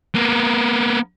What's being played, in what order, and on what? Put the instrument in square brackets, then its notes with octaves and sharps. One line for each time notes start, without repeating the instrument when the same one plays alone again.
[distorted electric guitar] A#3 B3